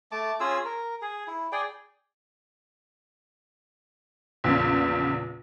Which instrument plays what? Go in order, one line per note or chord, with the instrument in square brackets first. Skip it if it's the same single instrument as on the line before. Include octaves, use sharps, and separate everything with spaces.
[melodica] A3 A5 D6
C#4 F4 G#4 E6
A#4
G#4
E4
G#4 D5 G5
[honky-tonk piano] A#1 E2 C#3